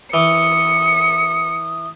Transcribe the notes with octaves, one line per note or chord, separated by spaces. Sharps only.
E3 D#6 C#7